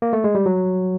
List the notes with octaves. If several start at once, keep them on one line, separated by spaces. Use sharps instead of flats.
A#3
A3
G#3
G3
F#3